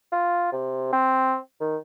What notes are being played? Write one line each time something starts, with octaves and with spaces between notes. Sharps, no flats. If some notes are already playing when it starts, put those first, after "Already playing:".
F4
C3
C4
D#3